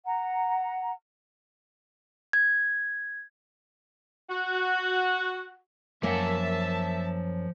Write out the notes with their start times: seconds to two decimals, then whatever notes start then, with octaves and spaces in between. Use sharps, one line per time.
0.05 F#5 A#5
2.33 G#6
4.30 F#4
6.03 F#2 F3 A#3 E5 F#5 A5